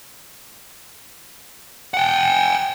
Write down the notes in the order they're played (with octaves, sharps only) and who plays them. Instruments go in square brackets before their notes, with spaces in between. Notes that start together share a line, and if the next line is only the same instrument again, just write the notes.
[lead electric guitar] F#5 G5